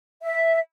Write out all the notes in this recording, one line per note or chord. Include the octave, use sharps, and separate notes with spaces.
E5